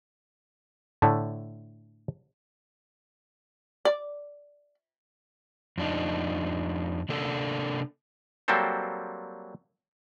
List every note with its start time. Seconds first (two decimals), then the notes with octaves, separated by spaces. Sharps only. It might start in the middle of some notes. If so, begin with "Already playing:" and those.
1.02 A2 D3 A3
3.85 D5
5.78 F2 D4 D#4
7.09 C3 A#3 D4 A4
8.48 F#3 G3 A#3 C4 A4 C5